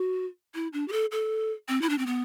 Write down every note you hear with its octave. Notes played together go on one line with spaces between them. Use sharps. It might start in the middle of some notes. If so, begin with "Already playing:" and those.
Already playing: F#4
E4
D4
G4
A4
A4
C4
E4
D4
C4
B3